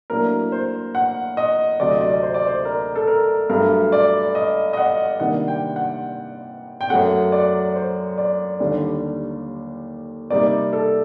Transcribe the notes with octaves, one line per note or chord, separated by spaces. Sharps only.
A2 F#3 A#3 D4 A#4
C5
F#5
D#5
D2 C3 F#3 D5
D#5
D5
C5
D5
C5
A#4
A4
A#4
G2 F#3 A3 A#4
D5
D#5
D#5
F#5
C3 D#3 G3 A#3 D4 F#5
G5
F#5
G5
F#2 F#3 A3 F#5
D5
C5
D5
D#2 D3 G3 D4
C3 G3 A#3 D#4 D5
A4